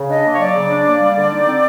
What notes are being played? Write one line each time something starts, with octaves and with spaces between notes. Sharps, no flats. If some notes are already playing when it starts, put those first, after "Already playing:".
Already playing: C#3
D4 D#5
A#3
C#5
F#3 D5
C#3
D4
A#3
G3
D3
D#4
C4